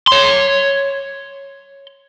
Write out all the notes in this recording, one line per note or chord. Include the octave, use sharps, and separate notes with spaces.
C#5 C6